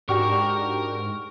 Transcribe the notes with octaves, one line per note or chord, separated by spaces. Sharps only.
G#2 D4 F#4 G4 A#4 A#5 C#6